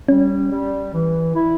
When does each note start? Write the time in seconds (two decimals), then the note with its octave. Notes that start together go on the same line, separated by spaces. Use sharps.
0.08 G3 C#4
0.51 G3
0.94 E3
1.35 E4